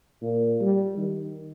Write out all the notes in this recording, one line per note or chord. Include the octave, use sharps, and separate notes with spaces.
A#2
G3
D#3